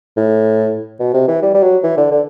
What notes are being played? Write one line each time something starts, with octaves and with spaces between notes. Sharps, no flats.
A2
B2
C3
E3
G3
G3
F#3
E3
D3
D3